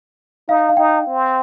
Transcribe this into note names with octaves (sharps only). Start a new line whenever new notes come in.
D#4 F5
F5
D#4 G5
C4